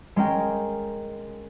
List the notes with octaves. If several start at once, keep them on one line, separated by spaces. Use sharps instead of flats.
G#3 C#4 A#4 G5